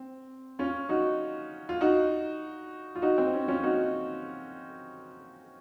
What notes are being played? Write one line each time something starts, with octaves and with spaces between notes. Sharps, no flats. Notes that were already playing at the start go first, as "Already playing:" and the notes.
Already playing: C4
C#4 F4
D#4 F#4
F4
D#4 F#4
F4
D#4 F#4
C4
C#4
C#4 F4
D#4 F#4